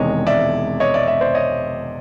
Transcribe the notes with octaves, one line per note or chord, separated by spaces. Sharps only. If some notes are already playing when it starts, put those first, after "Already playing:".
Already playing: E1 E2 C3 D#3 G#3 C#5 D#5
D5 E5
C#5 D#5
D5 E5
D5 E5
C5 D5
C#5 D#5